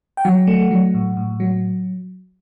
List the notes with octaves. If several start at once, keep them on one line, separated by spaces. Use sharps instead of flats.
G5
F#3 F#5
A3
F#3
A2
A2
F#3